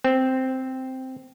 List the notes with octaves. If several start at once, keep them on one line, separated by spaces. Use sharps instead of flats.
C4